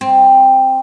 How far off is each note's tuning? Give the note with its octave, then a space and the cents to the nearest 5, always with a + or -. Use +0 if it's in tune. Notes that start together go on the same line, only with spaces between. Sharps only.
C4 +5